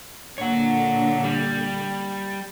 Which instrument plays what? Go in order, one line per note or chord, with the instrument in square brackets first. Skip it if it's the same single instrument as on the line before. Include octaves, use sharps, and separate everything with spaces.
[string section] A#2 D3 [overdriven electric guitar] C#5 F#5
[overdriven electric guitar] G3